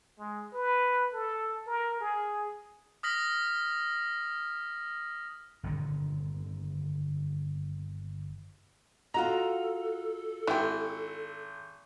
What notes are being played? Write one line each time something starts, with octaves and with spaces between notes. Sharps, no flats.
G#3
B4
A4
A#4
G#4
D#6 F6 A#6 B6 F#7
G1 A#2 D3 D#3
F4 F#4 A4 D#5 A#5
G#1 E4 G4